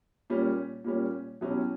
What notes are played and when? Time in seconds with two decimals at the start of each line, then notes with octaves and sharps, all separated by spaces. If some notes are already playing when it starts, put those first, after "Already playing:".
0.30 A#2 G3 C#4
0.84 A#2 G3 C#4
1.41 B2 F#3 C#4 E4 G4